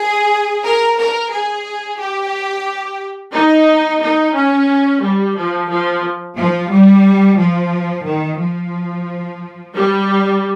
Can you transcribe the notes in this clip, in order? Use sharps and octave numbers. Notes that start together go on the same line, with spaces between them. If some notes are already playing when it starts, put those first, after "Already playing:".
Already playing: G#4
A#4
A#4
G#4
G4
D#4
D#4
C#4
G3
F3
F3
F3
G3
F3
D#3
F3
G3